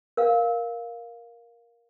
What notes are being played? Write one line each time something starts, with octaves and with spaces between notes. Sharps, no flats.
A#4 F5